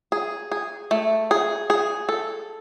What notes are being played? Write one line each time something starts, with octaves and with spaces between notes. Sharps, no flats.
G#4
G#4
A3
G#4
G#4
A4